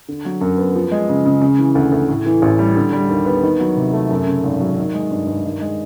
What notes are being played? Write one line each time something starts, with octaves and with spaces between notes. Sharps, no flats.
D3
F#3
F#2
B3
F3
G#3
C#3
C#3
C#3
E3
D2
D2
A2
E3
A1
G3
D3
G3
D#2
B3
D#3
F#3
C3
A3
F#2
C#3
G#1
F#3
D#3
G#3
G2
G2
D#3
G#3